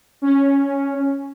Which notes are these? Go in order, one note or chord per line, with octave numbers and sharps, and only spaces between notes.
C#4